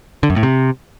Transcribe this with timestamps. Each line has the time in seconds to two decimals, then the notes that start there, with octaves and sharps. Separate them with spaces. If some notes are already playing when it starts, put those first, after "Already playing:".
0.23 D3
0.30 F#2
0.36 A2
0.43 C3